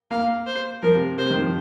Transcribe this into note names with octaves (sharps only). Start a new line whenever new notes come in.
A#3 F5
C5
F3 A#4
C3
C3 C5
D#3
F3